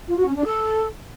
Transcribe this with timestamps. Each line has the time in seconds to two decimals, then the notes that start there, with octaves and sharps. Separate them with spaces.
0.08 F4
0.17 F#4
0.26 C#4
0.35 D4
0.44 A4